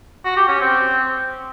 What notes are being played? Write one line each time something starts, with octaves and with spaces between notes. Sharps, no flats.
F#4
G4
C#4
C4